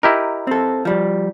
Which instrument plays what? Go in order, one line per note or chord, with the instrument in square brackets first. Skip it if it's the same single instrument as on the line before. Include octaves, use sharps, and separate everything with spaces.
[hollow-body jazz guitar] D#4 [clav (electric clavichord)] E4 G4 A#4
[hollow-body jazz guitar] C4 A4
F3 G3